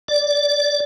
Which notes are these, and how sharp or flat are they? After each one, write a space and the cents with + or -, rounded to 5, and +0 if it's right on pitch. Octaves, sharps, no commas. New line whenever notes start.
D5 -10